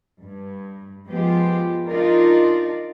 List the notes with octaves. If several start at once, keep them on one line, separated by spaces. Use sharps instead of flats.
G2
F3 G#3 B3 F4 G4
D4 D#4 F4 A#4 D5